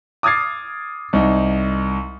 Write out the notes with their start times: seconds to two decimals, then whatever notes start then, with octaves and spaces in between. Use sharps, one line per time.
0.23 D6 D#6 F6 G#6 A6 C7
1.13 C2 D#4